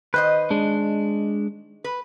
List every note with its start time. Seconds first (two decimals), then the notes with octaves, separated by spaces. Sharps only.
0.14 D#3 B4 C5 D#5
0.51 G#3 D4
1.84 B4